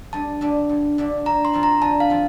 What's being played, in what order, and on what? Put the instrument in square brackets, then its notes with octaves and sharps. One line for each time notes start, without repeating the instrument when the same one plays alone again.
[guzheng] G2 [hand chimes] A5
[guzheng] D3 A3 D4
G2
D3 A3 D4
[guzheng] D3 [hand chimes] A#5
[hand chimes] C6
[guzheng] F3 C4 F4
[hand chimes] A#5
[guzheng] D3 [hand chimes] A5
[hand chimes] F5
[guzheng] F3 C4 F4